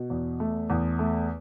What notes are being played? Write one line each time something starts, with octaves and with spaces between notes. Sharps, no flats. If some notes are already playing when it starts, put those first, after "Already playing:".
Already playing: B2
E2
A3
E2
A3